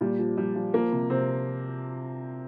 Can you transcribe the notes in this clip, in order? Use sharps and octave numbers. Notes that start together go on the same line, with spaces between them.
A#2 G3
F3
F3 G3
F3
F3 A#3
C3
C3 C4